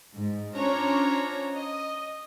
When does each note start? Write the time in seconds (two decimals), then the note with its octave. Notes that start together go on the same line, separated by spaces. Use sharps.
0.17 G#2
0.57 C#4 D4 F4 C5 C#5 A#5
1.54 D#5